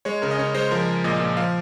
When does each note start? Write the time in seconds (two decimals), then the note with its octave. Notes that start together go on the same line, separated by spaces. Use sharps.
0.05 G#3 C#5
0.22 C#3 A#4
0.31 D#5
0.39 C#3 C#5
0.54 G#3 C5
0.71 F3 A#4
0.88 G#3
1.04 A#2 D#5
1.20 A#2
1.37 F3 F5